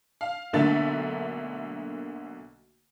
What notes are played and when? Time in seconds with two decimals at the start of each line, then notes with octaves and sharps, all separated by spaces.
0.21 F5
0.53 B1 D3 A3 A#3 E5 A6